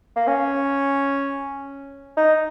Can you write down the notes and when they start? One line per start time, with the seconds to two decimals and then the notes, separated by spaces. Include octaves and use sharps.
0.16 A#3
0.27 C#4
2.17 D#4